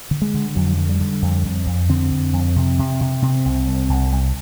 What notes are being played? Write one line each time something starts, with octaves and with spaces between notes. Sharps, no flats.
D3
G#3
D3
F2 F#3
D3
G3
D3
F2
F2
F2
D3 C4
F2
F2
C3
C3
C3
C3 C4
C2
C2
C2
C2